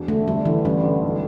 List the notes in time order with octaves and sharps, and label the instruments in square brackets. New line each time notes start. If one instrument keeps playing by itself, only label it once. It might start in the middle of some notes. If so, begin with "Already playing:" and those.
Already playing: [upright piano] E1
[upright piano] D3 [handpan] A3
[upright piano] G1 [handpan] G3
[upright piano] D3 [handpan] E3
[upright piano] A1 [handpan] G3
[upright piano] D3
B1